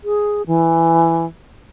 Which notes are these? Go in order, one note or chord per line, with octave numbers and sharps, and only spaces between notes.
G#4
E3